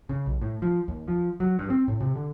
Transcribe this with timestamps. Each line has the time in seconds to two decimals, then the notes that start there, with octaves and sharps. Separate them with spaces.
0.09 C#3
0.26 B1
0.42 A2
0.62 F3
0.88 D#2
1.08 F3
1.40 F#3
1.59 G2
1.70 C4
1.88 A2
2.00 C3
2.15 D3